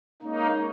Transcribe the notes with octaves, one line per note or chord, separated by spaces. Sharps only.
G#3 A#3 C#4 D#4 A#4 C#5